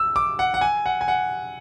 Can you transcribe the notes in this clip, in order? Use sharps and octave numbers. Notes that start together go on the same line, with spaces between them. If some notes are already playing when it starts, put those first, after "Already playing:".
Already playing: E6
D6
F#5
F#5
G#5
F#5
G#5
F#5